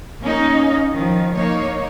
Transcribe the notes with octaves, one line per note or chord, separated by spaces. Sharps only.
A#3 C#4 D#4
D#3 F3
A#3 D#4 C#5